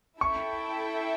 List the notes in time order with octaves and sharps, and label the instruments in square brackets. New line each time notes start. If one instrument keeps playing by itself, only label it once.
[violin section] E4 A4 E5 G5 [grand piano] C#6